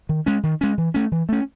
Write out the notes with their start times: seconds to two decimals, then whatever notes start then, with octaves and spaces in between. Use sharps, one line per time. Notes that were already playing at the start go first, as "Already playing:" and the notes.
0.09 D#3
0.26 G#3 C#4
0.43 D#3
0.61 G#3 C#4
0.78 E3
0.94 A3 C#4
1.12 E3
1.29 A3 C#4